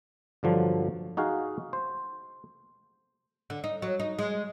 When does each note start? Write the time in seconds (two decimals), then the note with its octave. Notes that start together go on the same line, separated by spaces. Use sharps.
0.43 G2 D3 F3 F#3
1.17 D#4 F#4 G#4 F5
1.73 C5
3.50 D3
3.64 D#4
3.82 F#3
4.00 D#4
4.19 G#3